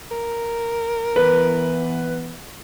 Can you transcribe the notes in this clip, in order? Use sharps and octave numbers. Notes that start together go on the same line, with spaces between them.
A#4
E3 B3 B4